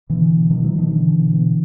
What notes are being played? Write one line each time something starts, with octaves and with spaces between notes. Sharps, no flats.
B2 D3 E3
B2
B2 D#3 F3
E3 F#3
B2
D#3 F3
B2 D3 E3
B2
B2